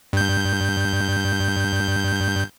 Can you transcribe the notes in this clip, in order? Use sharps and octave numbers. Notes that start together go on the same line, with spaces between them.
G2 G6